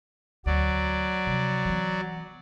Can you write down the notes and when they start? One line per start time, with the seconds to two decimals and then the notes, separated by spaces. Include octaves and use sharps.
0.46 D2 F#3 D5
1.27 C3 F3
1.65 E3 B3